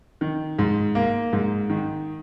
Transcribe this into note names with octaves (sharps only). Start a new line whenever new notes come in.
D#3
G#2
A#3
G#2
D#3